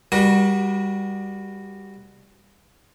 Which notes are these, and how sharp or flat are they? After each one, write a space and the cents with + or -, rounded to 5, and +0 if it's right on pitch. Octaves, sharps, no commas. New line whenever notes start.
G3 +15 F#4 +0 A#4 +45